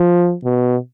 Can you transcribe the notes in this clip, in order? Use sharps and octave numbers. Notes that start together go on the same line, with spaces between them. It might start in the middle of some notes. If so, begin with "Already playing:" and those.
Already playing: F3
B2